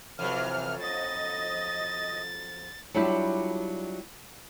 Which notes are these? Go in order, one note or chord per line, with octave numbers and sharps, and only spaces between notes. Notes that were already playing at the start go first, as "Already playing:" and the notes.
F2 C3 E3 F#3 F6
D#5 A6
F#3 G3 D4 E4 F4 G4